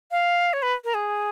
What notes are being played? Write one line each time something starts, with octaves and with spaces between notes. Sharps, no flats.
F5
C#5
B4
A#4
G#4